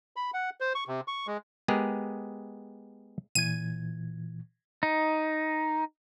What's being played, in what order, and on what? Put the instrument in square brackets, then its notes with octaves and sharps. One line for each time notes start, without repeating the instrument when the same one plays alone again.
[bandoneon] B5
F#5
C5
C#6
C3
C#6
G#3
[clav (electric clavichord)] G#3 B3 G4 G#4 A#4
[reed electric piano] A#2 E3 G#6 [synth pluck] D#7
[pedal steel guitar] D#4